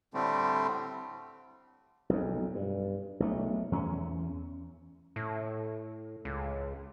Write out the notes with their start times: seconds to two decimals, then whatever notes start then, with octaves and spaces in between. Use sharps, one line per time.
0.14 A2 D3 G3 A3 C4
2.09 B1 F2
2.55 G2
3.20 B1 A3
3.72 E2 G#3 C#4
5.16 A2
6.25 C#2